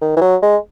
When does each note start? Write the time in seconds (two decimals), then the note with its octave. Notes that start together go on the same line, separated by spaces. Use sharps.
0.01 D#3
0.17 E3
0.21 F#3
0.42 G#3